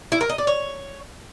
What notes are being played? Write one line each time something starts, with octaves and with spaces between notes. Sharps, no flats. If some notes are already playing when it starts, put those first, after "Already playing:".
E4
A#4
D#5
D5
C#5